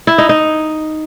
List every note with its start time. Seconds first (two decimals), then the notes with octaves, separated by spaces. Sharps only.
0.07 E4
0.18 D#4
0.29 D#4